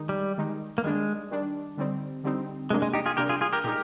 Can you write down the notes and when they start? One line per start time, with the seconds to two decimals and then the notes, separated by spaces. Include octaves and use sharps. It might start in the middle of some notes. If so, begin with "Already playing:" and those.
Already playing: D#3 G#3 D#4
0.09 G3
0.38 D#3 G#3 D#4
0.78 A#3
0.84 D#3 G3 G#3 D4
1.31 D#3 G3 D4
1.77 D3 G3 C4 D#4
2.24 D3 G3 C4 D#4
2.70 C3 G3 G#3 A#3 D4
2.82 G#3
2.94 D#4 G4
3.06 F4 G#4
3.17 C3 G3 A#3 D4 G4 A#4
3.29 F4 G#4
3.41 F4 G#4
3.53 G4 A#4
3.64 A#2 G#3 D#4 G4 A#4